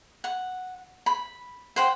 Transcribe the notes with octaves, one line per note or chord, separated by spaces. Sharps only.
F#5
B5
C5 F#5 G5